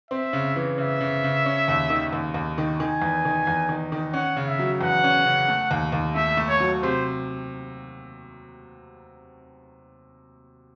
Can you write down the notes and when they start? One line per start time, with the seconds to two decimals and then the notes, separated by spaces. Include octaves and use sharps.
0.11 C4 E5
0.33 C#3
0.56 E3
0.78 C#3 E5
1.00 C#3
1.24 C#3
1.46 C#4
1.68 D#2
1.90 D#3
2.13 D#2
2.34 D#2
2.58 D#3
2.79 D#3 G#5
3.02 E2
3.25 D#3
3.47 E2
3.69 D#3
3.92 D#3
4.13 C#4 F#5
4.37 C#3
4.48 E5
4.59 F#3
4.81 E2 F#5
5.04 C#4
5.25 C#3
5.48 A3
5.71 D#2
5.92 D#2
6.15 A3 E5
6.37 A3
6.49 C#5
6.60 F#3
6.82 C3 C5